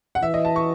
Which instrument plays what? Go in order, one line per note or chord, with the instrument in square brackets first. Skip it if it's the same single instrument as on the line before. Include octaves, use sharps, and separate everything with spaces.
[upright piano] F#5
[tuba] E3 [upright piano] E5
[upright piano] D#5
A5
C#6